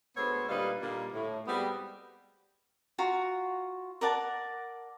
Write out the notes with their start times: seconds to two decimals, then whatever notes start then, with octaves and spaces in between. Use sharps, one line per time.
0.17 D2 G#3 B3 A4 C5 C#5
0.49 A#2 D3 G3 D#4 B4 F5
0.82 A#2 D3 G3 A#3
1.13 A2
1.47 G3 G#3 B3 C4 F#4 G4
2.98 F4 F#4 A#5
4.01 A#4 D5 F#5 A5